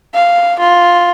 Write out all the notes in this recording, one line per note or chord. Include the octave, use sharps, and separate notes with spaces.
F5
F4